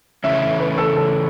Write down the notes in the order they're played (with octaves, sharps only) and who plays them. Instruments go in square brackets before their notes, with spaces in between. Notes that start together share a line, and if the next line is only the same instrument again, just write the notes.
[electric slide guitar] C#3 E3 A3 C#4 [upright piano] E5
[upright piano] E5
B4
A4
A4